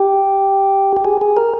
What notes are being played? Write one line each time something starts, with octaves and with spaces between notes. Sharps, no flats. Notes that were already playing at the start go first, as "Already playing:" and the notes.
Already playing: G4
G4
G#4
G#4
A#4